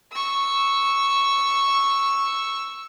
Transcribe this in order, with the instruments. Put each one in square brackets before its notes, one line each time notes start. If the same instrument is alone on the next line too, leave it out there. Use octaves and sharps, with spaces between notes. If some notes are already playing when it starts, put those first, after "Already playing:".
[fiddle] C#6 E6